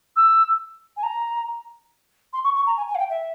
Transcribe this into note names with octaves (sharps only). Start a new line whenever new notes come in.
E6
G#5
A#5
C6
C#6
C#6
A#5
G#5
G#5
F5
G5
E5